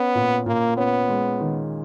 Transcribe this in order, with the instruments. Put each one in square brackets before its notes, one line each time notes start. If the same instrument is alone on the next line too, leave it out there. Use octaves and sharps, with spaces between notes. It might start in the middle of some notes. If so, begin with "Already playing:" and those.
Already playing: [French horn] B3 [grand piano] C#4
[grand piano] A#2
[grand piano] A#2 [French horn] A#3
[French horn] B3 [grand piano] C#4
[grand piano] G#3
D#3